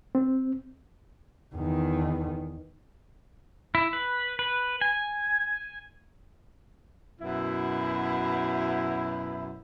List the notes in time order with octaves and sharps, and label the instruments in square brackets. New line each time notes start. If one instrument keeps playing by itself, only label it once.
[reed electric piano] C4
[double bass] E2 D#3
[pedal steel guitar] E4
B4
B4
G#5
[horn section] F#2 B2 E4